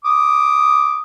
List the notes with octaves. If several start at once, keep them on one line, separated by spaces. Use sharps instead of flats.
D6 D#6